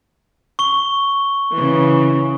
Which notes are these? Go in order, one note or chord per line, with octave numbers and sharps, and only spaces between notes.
C#6 G7
C#3 E3